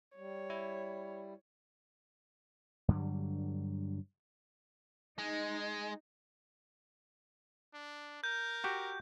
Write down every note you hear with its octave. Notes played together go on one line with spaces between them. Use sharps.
G3 C#5
E4
G2 D3 F#3 G3
G#3 D#4
D4
A#4 G6
F#4 G4